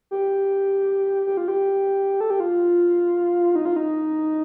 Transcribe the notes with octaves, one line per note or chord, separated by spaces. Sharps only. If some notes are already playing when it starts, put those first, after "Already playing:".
G4
G4
F4
G4
A4
G4
F4
D#4
F4
D#4